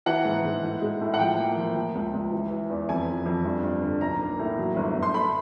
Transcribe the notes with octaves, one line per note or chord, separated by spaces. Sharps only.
E3 F#5
G#2
G#2
A2
G#3
A2
F#5
F3 G5
A#3
F3
F3
C#2
C#2
E3
E3
E2
F2 G#5
F3
F2
G2
G2
D3
B1 A#5
A#3
A2
F#3
G1
G1
C6
A3 B5